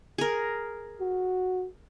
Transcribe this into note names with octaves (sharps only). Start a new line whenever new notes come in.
G#4 A#4
F#4